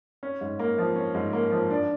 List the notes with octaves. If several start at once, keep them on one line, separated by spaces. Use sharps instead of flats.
C#4
G#2
A#3
F3
C#4
G#2
A#3
F3
D4